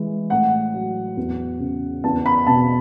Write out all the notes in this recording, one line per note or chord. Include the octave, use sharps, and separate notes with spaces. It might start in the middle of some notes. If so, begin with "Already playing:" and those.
Already playing: E3 G#3
A2 F#5
F#3
E2
C#3
E2 A5
B5
B2 A5